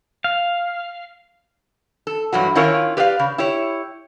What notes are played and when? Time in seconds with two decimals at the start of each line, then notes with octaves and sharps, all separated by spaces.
0.24 F5
2.07 A4
2.32 G2 E3 F#3 F#4
2.55 D#3 C#4 E4 F4 A#4 C#5
2.97 G4 B4 D5 E5 F5
3.19 C#3
3.38 E4 G4 C#5